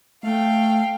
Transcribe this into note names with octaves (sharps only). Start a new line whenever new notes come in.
A3 F5 G5